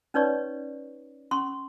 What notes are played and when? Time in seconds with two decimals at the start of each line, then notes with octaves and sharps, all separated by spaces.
0.14 C#4 D#4 B4 C#5 D5 C#6
1.31 C#4 C6 C#6